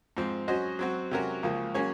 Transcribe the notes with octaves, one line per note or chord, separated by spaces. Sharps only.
G#2 F3 C4
F#3 C#4 F#4 C5 D#5
F#3 C4 F#4
C3 F#3 C#4 F#4 A#4
C#2 C#3 F3 A#3
F#3 A#3 C#4 G#4 C#5